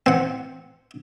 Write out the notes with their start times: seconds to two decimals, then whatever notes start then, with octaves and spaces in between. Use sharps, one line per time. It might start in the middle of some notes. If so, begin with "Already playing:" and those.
0.06 C4 F#5